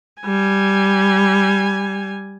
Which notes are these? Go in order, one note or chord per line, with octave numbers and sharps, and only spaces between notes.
G3 G#5